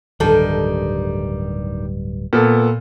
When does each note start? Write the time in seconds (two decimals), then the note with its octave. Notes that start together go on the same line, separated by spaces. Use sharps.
0.20 D1 G2 D#3 G3 A4
2.33 A#2 B3 A4